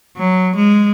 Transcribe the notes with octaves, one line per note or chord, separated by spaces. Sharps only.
F#3
G#3